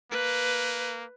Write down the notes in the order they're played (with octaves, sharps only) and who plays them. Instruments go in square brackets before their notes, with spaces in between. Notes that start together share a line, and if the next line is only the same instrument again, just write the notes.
[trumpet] A#3 [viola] B4